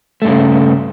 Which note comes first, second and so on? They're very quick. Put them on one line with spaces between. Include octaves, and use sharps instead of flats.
A3 G2 C#3